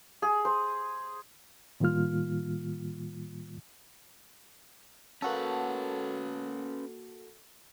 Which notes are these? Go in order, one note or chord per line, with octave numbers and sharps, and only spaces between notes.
G#4
C5
A2 D#3 G3 A#3 F4 F6
A#3 C#4 F#4 A4 B4